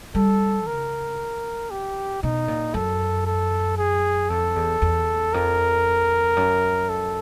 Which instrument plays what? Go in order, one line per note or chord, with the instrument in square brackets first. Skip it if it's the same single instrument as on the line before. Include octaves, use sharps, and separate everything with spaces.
[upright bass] G3 [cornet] A4
[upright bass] C#3 [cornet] A#4
[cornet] G4
[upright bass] B2 [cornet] D#4
[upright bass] A#2
[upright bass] F#2 [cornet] A4
[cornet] A4
G#4
[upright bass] F2 [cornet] A4
[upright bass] E2
E2
[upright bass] F2 [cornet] A#4
[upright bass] F#2
[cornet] A4